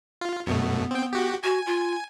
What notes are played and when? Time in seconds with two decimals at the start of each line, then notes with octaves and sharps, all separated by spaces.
0.21 F4
0.47 F#2 B2 A3 B3
0.91 C4 G5
1.13 F#4 G4
1.43 F#4 G#5
1.66 F4